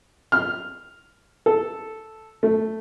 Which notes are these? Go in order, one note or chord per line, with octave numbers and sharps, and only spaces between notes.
F6
A4
A3